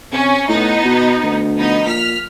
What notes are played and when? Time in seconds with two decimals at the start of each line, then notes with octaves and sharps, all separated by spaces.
0.12 C3 C#4
0.49 A2 B3 D#4
0.84 B2
1.23 D2
1.56 F3 B3 D#4
1.86 A#2 F6 B6